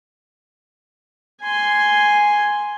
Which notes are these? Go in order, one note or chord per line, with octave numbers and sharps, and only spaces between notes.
G#5 C6